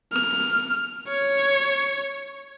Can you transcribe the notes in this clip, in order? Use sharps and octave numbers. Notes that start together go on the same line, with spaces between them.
F6
C#5